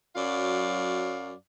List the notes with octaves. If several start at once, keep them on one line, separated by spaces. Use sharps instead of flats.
F#2 F#3 D5 F5